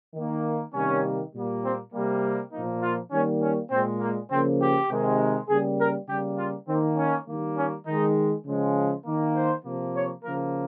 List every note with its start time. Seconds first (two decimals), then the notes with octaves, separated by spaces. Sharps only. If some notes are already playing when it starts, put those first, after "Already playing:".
0.15 D#3 A#3
0.74 C3 D#3 G3 A#3 C#4
1.34 A#2 G3 A#3
1.63 C4
1.92 C3 G3 A#3
2.52 A#2 F3 A#3 D#4
2.83 F4
3.12 D#3 G3 A#3 C#4
3.42 C#4
3.70 A#2 G#3 C4
4.00 A#3
4.30 C#3 F3 A#3 C4
4.60 G4
4.90 C3 D#3 G#3
5.49 C#3 G3 A#3 G#4
5.78 A#4
6.08 C#3 G3 A#3 G4
6.39 F4
6.68 D#3 C4
6.72 A#3
6.97 C#4
7.27 D#3 G3 A#3
7.56 C#4
7.86 D#3 G#3 D#4
8.46 C#3 F3 G#3
9.05 D#3 A#3
9.35 C5
9.64 C3 F3 A#3
9.95 C#5
10.23 C#3 F3 A#3 A#4